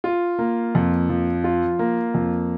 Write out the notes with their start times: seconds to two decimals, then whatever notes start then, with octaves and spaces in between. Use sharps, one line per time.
0.04 F4
0.39 A#3
0.75 F2
1.10 F3
1.44 F4
1.79 A#3
2.15 F2